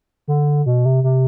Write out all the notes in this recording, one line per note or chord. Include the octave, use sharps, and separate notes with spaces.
D3
B2
C3
C3